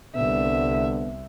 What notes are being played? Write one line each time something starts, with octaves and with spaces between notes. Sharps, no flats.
C2 D3 B3 E5